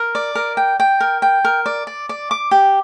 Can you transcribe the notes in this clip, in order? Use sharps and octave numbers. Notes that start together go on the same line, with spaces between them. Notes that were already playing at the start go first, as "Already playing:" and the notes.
Already playing: A#4
D5
A#4
G5
G5
A#4
G5
A#4
D5
D5
D5
D6
G4